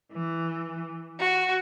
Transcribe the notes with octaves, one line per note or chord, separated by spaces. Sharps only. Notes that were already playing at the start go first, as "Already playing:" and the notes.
E3
F#4